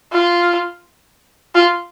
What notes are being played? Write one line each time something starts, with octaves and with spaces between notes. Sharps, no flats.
F4
F4